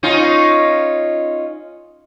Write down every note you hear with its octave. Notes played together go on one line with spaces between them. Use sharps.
C#4 D#4 F4